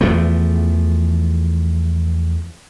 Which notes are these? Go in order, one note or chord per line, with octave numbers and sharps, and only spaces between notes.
E2 E3 F3 A3